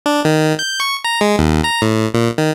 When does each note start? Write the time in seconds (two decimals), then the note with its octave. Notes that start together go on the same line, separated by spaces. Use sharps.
0.06 D4
0.25 D#3
0.59 G6
0.80 C#6
1.05 A#5
1.21 G#3
1.39 D#2
1.64 A#5
1.82 A2
2.14 A#2
2.38 D#3